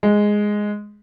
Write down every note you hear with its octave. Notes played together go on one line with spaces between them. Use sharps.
G#3